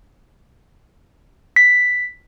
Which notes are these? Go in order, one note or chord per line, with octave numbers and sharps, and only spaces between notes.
B6